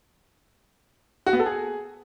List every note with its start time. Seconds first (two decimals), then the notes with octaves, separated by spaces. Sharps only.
1.26 F#4
1.33 B3
1.39 A4
1.46 G#4